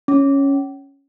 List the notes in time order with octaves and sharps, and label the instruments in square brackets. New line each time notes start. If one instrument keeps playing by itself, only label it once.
[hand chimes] C#4